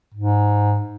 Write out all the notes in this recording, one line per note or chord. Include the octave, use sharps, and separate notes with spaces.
G#2